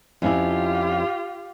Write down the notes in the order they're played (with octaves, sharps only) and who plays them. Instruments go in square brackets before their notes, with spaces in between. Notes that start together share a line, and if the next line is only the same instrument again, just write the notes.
[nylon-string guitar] F2 C#4 E4 [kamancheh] F4 G4